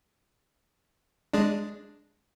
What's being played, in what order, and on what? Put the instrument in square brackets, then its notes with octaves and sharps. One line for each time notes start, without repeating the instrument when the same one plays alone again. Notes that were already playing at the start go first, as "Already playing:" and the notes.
[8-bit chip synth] G#3 D4